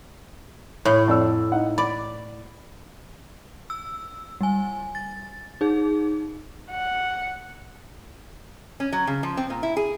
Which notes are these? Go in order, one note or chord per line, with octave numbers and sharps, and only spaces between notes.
A2 C#5
F2 D5 E6
D#4 F#5
D5 B5
E6
G3 G#5
A6
D#4 G#4
F#5
C#4
F#3
C#3
F3
C4
A#2
E4
G#4